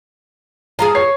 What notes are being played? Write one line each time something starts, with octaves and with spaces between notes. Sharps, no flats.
F3 F4 G#4 A#5
C#5 C7